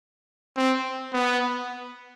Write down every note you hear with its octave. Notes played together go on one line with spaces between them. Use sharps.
C4
B3